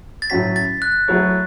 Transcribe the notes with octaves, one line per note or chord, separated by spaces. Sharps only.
A6
A2 F#3 C#4 F#4 B6
A6
F#6
F#3 A3 E4 A4 C#5